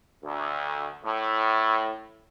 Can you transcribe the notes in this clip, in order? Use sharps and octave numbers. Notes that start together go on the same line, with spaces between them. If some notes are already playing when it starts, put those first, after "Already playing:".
D2
A2